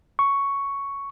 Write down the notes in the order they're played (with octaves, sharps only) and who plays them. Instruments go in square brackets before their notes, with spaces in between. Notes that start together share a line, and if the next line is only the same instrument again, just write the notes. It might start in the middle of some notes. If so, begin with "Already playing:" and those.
[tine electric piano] C#6